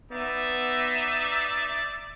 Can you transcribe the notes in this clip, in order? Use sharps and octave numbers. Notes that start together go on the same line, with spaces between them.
B3 D#4 D5 E5